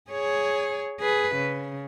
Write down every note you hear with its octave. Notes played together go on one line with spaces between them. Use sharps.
G#4 C#5
G#4 B4
C#3